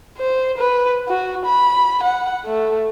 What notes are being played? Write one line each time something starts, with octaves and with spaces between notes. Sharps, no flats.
C5
B4
F#4
B5
F#5
A3